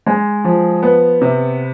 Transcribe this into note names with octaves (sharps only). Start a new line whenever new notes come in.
G#3
F3
B3
C3